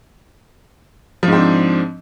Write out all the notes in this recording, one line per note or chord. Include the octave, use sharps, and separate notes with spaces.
G#2 F3 C4 D4